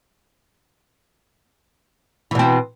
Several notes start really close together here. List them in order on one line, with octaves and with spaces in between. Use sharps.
E3 B2 C4